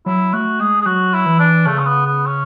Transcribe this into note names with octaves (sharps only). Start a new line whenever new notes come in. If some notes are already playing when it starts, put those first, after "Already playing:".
F#3 E4
A3 F#4
G#3 G#4
G#4
F#3 F#4
E4
E3
D4
C#3 A3
C#4
B3
B3
C#4